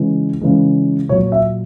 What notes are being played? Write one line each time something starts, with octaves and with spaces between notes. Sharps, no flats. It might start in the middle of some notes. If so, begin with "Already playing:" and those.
Already playing: C#3 E3 G#3
C#3 E3 G#3
A#2 F#3 C#5
E5